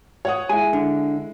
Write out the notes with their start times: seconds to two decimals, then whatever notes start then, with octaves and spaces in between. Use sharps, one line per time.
0.25 C#5 F#5 D#6
0.49 G#3 E4 G#5
0.73 D3